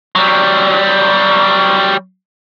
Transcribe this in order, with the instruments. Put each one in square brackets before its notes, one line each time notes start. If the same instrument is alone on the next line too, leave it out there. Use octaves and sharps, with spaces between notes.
[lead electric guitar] F#3 G3